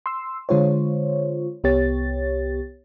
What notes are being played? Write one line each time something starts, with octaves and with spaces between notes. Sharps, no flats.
C6 E6
D3 G#3 F4 C5 C#5
C2 B3 G4 C#5 A6